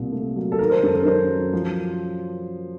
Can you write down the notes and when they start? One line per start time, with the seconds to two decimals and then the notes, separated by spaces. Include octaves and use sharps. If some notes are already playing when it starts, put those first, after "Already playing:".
Already playing: C2 A#2
0.12 A3
0.36 F#3
0.52 A4
0.59 D#3 A#4
0.71 C5
0.83 F#2 A4
0.94 A#4
1.06 F#2 C5
1.29 F#3
1.53 F3